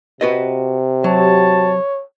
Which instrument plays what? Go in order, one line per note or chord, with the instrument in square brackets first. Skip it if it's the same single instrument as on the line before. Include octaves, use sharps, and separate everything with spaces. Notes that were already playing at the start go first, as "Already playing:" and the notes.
[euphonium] C3 [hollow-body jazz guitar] F#4 B4 D#5
[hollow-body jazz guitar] F#3 [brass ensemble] F#4 G4 A5 [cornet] C#5